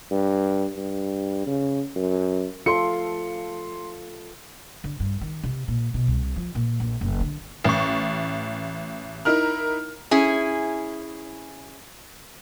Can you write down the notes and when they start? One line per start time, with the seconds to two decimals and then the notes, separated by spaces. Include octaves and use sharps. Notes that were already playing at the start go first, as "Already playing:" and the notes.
0.11 G2
0.76 G2
1.46 C#3
1.96 F#2
2.66 F4 A4 C6 C#7
4.84 D3
5.00 G2
5.21 D#3
5.43 C3
5.68 A#2
5.94 B2
6.08 C2
6.36 F3
6.55 A#2
6.80 A#1
7.01 F#1
7.20 D3
7.64 A1 C#6
9.25 D#4 E4 A#4 F6
10.11 C#4 E4 G#4